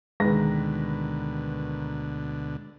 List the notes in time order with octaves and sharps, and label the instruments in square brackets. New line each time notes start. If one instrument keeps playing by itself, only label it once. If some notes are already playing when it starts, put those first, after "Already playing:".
[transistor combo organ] D2 B2 D3 [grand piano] D#3 B4 A#6 [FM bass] G#3